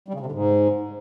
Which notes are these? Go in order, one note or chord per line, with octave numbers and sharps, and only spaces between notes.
G3
C#3
C3
D3
G#2